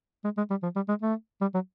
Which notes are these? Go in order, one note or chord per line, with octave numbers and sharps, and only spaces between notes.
G#3
G#3
G3
F3
G3
G#3
A3
G3
F#3